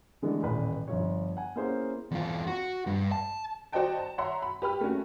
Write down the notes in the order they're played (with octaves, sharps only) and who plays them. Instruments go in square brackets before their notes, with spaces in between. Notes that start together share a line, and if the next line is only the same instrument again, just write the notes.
[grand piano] D3 E3 G#3 A3 B3 D4
D#1 A1 B4
G1 F3 C#5
F#5 G#5
A#3 B3 C#4 E4 G#4 C5
[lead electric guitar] E2 F4
F#4
G2
A5
[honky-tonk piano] F#4 C5 D5 D#5 G5 A5
A5
C#5 E5 F#5 A#5 C6
B5
G4 B4 B5 F6
A3 A#3 C#4 F#4